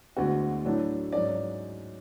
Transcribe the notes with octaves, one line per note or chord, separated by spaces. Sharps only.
D2 D3 G#3 B3 F#4
A2 F#3 A3 D4
G#2 F#3 C#4 D5